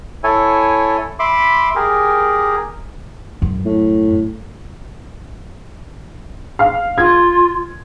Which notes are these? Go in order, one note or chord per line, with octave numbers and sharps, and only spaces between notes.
E4 A4 C#5 G#5
E5 B5 C6 D6
G4 G#4 A#4
F#2
A2
F5
F4 G#6